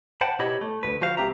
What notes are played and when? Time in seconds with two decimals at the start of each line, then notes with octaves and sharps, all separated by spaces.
0.21 C5 F#5 G5 A5 B5
0.39 B2 E4 G4 C#5 D#5 B5
0.61 A3
0.83 D2 G2 B4
1.01 F3 F#4 C5 F5
1.17 C#2 C4 G4 E5 A#5